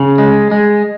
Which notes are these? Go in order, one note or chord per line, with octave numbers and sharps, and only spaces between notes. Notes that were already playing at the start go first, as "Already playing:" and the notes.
Already playing: C#3
G#3
G#3